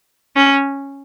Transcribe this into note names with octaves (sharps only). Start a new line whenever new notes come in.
C#4